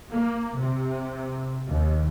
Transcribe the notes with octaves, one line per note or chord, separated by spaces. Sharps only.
A#3
C3
D#2